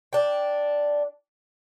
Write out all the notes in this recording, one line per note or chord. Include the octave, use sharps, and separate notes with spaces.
D4 G5